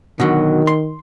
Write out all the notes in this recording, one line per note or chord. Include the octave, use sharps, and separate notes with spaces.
B2 D3 D#3 F#3
C6